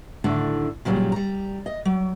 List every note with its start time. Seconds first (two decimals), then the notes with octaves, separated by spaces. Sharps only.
0.24 D2 A2 D3 D#3 D4
0.85 A#2 C#3 F#3 G3
1.12 G3 A#5
1.66 D#5
1.85 F#3